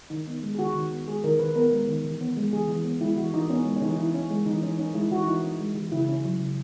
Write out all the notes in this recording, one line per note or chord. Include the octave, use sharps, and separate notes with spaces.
D#3 D#4
B3
G#3
G#4
D#3 F#4
D#3
B3
G#3 G#4
D#3 A#4
D#3 B4
B3 A#4
G#3
D#3
E3
B3
G#3
E3 G#4
E3
B3
G#3 E4
E3 F#4
E3 D#4
B3 C#4
G#3
C#4
E3 D#4
E3 E4
C#4
G#3
E3 D#4
E3 C#4
C#4 D#4
G#3 E4
E3 F#4
E4
E3 D#4
C#4
G#3
E3
C#3 E4
C#4
F#3
C#3